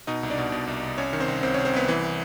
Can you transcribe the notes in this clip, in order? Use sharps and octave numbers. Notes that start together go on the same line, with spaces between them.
B2 D#4 D#5
C2
D4 D5
B2
B2
C2
C2
C2 C#4 C#5
D#3
C4 C5
C2
C2 C4 C5
C#4 C#5
C2
C4 C5
C2 B3 B4
E3